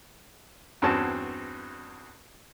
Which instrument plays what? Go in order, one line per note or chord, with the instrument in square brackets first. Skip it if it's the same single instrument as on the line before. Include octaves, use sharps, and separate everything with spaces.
[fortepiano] E2 G2 C4 C#4 F#4 A5